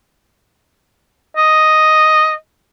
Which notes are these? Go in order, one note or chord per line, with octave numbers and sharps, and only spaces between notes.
D#5